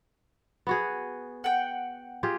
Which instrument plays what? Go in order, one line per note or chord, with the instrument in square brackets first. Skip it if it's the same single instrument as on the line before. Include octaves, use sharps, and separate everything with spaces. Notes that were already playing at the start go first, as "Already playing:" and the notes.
[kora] B3 F#4 G#4
[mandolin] F#5 G5
[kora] F4 G4 G#4